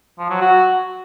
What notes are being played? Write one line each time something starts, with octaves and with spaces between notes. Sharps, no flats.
F3
F#3
F#4